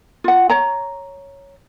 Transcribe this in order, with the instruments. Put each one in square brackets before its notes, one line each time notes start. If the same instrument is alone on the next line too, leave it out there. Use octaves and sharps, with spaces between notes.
[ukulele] F4 F#5
C#5 A#5